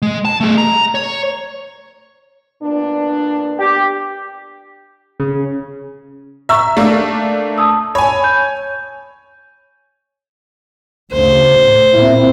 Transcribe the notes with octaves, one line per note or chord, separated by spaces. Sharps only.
G#3
A5
A3 G#4
A#5
C#5
A#2 B3 D4
G4
C#3
E5 A#5 C#6 E6
A3 A#3 D4
A5 D#6 E6
C#5 G#5 B5
G6
D2 C#3 C5
A2
A#2 C4 E4